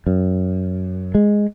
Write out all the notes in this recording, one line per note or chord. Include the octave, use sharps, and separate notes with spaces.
F#2
G#3